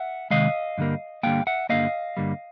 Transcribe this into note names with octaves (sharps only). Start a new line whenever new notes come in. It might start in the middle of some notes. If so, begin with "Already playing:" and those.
Already playing: E5 F#5
C3 D#3 G#3 D#5 F5
G2 D3 G3 A#3
G2 D3 G3 A#3 F5 G5
E5 F#5
G2 D3 G3 A#3 D#5 F5
G2 D3 G3 A#3